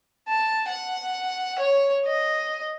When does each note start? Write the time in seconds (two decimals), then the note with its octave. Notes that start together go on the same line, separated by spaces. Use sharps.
0.29 A5
0.68 F#5
1.59 C#5
2.06 D#5